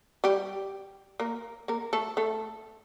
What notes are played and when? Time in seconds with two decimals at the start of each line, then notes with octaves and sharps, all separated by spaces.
0.24 G3 G4
1.20 A#3 A#4
1.68 A#3 A#4
1.93 A3 A4
2.17 A3 A4